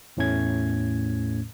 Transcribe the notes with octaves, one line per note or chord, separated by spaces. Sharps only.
E2 A2 A3 C#4 G#6